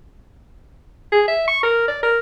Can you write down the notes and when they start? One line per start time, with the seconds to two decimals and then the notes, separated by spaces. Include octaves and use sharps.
1.12 G#4
1.28 E5
1.48 C#6
1.63 A#4
1.88 D5
2.03 A#4